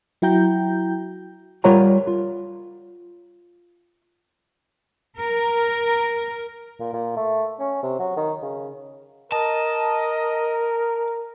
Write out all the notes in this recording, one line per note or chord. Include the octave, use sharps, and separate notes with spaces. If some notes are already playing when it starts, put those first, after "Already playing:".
F#3 E4 F#4 G5 A#5 G6
G3 F4 A#4 C#5 F#5 A#5
F4
A#4
A#2
A#2
A3
C#4
C3
F#3
D#3
C#3
A#4 D#5 A5